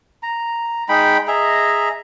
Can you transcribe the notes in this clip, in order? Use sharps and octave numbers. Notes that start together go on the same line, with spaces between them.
A#5
G#3 D#4 G5 B5
G#4 D#5 E5 A#5